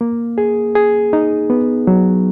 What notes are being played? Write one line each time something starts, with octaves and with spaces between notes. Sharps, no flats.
A#3
G#4
G#4
D#4
B3
F#3